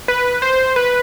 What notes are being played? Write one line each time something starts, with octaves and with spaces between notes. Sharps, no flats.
B4
C5
B4